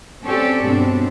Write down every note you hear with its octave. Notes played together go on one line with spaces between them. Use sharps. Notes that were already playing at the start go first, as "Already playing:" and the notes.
C4 C#4 G4 A4 C#5 D5
G2 B2 C4 D4